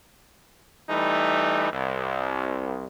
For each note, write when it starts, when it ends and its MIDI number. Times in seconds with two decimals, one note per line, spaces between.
0.90 1.70 52
0.90 1.70 55
0.90 1.70 57
0.90 1.70 63
1.73 2.85 36